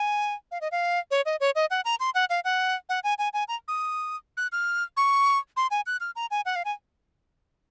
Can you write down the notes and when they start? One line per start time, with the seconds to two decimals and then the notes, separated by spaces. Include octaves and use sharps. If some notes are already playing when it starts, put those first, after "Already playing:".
Already playing: G#5
0.51 F5
0.61 D#5
0.72 F5
1.11 C#5
1.26 D#5
1.40 C#5
1.55 D#5
1.71 F#5
1.85 A#5
2.00 C6
2.15 F#5
2.30 F5
2.44 F#5
2.89 F#5
3.04 G#5
3.18 G#5
3.34 G#5
3.48 A#5
3.68 D#6
4.37 F#6
4.52 F6
4.97 C#6
5.57 C6
5.71 G#5
5.86 F#6
6.01 F6
6.16 A#5
6.31 G#5
6.46 F#5
6.56 F5
6.65 G#5